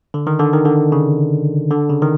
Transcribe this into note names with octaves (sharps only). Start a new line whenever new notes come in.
D3
D#3
D3
D#3
D3
C#3
D3
C#3
D#3